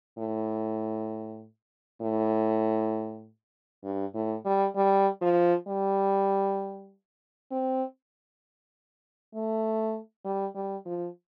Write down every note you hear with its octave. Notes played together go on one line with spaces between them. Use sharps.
A2
A2
G2
A2
G3
G3
F3
G3
C4
A3
G3
G3
F3